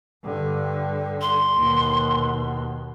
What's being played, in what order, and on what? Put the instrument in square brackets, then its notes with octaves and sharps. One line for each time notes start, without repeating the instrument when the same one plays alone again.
[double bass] G2 D3
[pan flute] C6
[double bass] D#2 B2